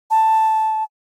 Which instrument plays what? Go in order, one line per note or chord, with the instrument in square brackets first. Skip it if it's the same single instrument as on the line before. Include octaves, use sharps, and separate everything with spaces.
[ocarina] A5